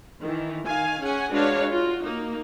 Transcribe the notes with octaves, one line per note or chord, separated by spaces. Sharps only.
D#3 E3
D#3 F5 G#5
C#4 G#4 F#5 G#5
G#3 D4 F#4 B4 C#5 F5
F4 F#4
A#3 D#4